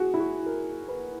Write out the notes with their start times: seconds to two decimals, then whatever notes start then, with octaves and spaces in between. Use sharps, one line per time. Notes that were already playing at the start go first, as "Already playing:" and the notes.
Already playing: F#4 G#4
0.14 E4
0.20 F#4
0.46 A#4
0.88 B4